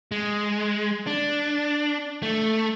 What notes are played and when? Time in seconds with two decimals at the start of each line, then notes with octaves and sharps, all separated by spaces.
0.12 G#3
1.07 D4
2.23 A3